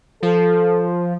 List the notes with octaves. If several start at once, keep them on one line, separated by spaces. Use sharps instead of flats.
F3 A4